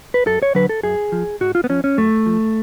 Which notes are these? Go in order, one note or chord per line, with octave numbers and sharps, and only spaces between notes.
B4
F#2 A4
C#5
D3 F#3 B4
A4
F#2 G#4
F3
G#2 F#4
F4
B3
F3 C#4
C#4
F#2 A3
F3